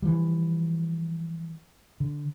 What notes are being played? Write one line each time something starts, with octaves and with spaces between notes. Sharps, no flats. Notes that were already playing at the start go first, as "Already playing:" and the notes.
E3 F3 G3
D3